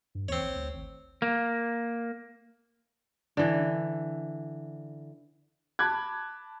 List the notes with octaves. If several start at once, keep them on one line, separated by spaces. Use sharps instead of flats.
G2
D#2 C4 C#5
A#1
D2
G#1
A#3
D3 E3
A5 B5 D6 F#6 G#6